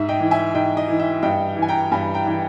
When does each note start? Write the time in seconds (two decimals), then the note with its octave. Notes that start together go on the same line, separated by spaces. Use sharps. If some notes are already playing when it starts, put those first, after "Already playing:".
Already playing: G#2 E5
0.09 D#5 G5
0.20 E3
0.31 E5 G#5
0.54 G#2 D#5 G5
0.77 D#5
0.88 E3
1.00 E5
1.23 G2 D#5 G5
1.57 E3
1.62 G#5
1.69 G5 A#5
1.92 G2 G#5 B5
2.14 G5 A#5
2.26 E3 G5